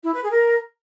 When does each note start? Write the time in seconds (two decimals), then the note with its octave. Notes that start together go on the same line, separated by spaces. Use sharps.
0.03 E4
0.13 B4
0.22 G#4
0.31 A#4